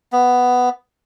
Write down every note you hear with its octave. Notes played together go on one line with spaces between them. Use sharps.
B3